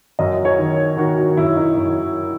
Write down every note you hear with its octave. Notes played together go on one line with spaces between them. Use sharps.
F#2 D#5
C#5
D#3
D#3 F#4
F#4
F#2 E4
D#4
F#2